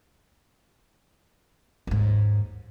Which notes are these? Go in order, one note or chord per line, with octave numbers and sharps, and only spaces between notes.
D#2 G#2